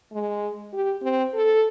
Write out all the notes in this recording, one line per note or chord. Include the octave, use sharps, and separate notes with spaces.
G#3
G4
C4
A4